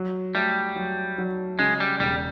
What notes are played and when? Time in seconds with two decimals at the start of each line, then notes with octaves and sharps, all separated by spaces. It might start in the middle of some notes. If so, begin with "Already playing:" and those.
Already playing: F#3
0.35 G3 A3
0.76 F#3
1.18 F#3
1.59 C#3 G#3
1.80 G3
2.00 E1 G3